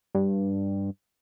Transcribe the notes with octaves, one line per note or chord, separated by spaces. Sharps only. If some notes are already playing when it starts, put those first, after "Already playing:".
G2